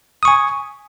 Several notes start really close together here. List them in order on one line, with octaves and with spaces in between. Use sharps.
D#6 C#6 G#5